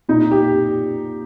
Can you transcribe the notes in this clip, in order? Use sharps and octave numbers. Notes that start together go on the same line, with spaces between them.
A#2 D#4
G4